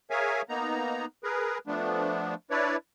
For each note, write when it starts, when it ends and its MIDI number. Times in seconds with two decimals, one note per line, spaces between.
0.10 0.42 68
0.10 0.42 70
0.10 0.42 73
0.10 0.42 76
0.10 0.42 77
0.10 0.42 80
0.49 1.06 58
0.49 1.06 59
0.49 1.06 63
0.49 1.06 82
1.24 1.58 68
1.24 1.58 70
1.24 1.58 71
1.67 2.34 53
1.67 2.34 57
1.67 2.34 59
1.67 2.34 62
2.51 2.76 62
2.51 2.76 64
2.51 2.76 71
2.51 2.76 73
2.51 2.76 74